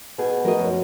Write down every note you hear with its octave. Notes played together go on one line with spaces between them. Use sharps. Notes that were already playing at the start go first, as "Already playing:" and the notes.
B2 G#4
F3 A3 F#4 A#4 D#5
F#2